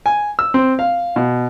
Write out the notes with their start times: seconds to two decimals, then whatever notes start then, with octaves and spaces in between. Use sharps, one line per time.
0.06 G#5
0.39 E6
0.54 C4
0.79 F5
1.16 B2